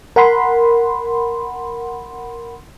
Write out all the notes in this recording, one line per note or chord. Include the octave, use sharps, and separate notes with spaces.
A#4 F#5 B5 C6